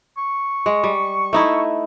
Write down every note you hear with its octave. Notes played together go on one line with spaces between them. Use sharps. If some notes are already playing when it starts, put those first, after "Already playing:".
C#6
G#3
G3
A3 D#4 E4